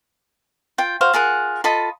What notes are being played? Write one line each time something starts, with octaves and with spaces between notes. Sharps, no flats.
F4 G5
F#4 C5 F5
F4 G#4 A#4 F#5
F4 A4 D#5 B5